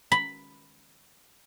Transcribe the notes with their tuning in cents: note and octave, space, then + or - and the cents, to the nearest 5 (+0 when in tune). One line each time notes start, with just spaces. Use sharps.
B5 +5